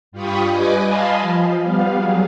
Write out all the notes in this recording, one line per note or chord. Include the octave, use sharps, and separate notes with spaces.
G2 F4 G4 B5 C#6 D#6
G3 B4 D#5 G#5 D6
D#5 F5 G#5 A5 B5 C6
F3
G3 B3 F5
F#3 G#4